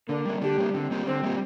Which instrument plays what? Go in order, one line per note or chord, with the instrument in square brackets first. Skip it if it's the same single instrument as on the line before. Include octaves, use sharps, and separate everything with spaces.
[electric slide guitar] D3 [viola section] A#3 D4
[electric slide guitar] G3 A#3
[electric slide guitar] D3 [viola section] D4 G4
[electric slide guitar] G3 A#3
[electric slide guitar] D3 [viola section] C4
[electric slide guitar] G3 A#3 G4
[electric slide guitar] D3 [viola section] C4
[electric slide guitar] G3 A#3 G4